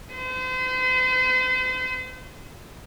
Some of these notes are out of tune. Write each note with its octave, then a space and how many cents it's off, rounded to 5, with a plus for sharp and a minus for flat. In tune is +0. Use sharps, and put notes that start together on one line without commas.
C5 -40